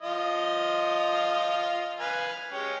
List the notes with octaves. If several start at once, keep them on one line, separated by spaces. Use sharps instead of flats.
F3 F4 D#5
B4 F5 G#5
G#3 C#4 G4